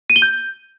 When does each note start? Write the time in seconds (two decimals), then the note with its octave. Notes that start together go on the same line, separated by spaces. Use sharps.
0.10 D#7
0.16 G7
0.22 G6